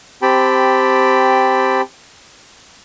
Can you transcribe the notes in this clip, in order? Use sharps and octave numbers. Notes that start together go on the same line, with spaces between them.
C4 G4 G5 A5 B5